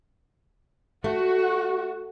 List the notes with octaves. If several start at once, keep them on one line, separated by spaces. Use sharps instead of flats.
A3 F#4